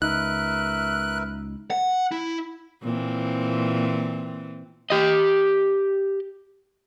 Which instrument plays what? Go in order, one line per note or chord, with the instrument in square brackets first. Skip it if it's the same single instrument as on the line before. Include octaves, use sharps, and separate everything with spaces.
[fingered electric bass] C#2 [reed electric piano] D#4 [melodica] A#4 B4 E5 [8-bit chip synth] F#6
[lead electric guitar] F#5
E4
[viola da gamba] A#2 E3 C4
[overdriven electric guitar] G4 D#5